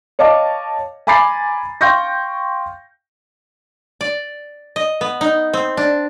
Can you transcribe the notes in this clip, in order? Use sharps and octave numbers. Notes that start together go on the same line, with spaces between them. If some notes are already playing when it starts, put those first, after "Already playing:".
C#5 D#5 F5 A5 D6
G#5 A#5 B5 D6 A6 C7
F5 G5 C6 C#6 G6 A#6
D5
D#5
B3
D#4
C4
D4